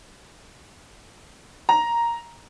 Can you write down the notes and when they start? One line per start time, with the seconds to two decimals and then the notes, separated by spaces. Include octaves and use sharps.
1.69 A#5